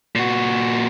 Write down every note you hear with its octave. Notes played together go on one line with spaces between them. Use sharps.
A#2 F#4